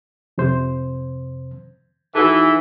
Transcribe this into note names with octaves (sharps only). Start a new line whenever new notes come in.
F2 C3 C5
E3 D#4 F#4 G#4 A4